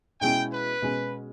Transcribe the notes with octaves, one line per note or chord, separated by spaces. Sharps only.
B2 G#3 C#4 E4 G5
B4
B2 G#3 C#4